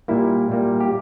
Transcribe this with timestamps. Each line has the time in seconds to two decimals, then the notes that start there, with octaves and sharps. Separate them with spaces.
0.08 A#2 G3 A#3 E4
0.49 A#2 G3 A#3
0.81 G4